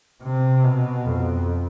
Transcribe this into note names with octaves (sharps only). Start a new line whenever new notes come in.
C3
B2
F2